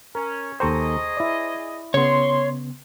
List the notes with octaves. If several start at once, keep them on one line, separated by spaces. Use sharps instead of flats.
C#4 A#4
D#2 G#4 A4 C5 D#5 G5 A#5 C#6
E4 D5
C#3 B3 C#5 C6